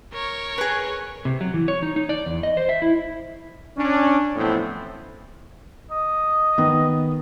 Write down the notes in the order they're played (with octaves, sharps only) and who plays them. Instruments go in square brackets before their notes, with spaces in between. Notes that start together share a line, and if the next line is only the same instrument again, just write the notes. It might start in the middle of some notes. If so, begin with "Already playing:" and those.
[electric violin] A#4 C#5
[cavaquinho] G#4 B4
[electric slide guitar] C3
F#3
E3
C#5
D#4
D#4
D5
E2
D#5
C5
E5
E4
[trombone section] C#4 D4
F2 A2 E3 B3 C4
[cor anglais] D#5
[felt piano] D#3 B3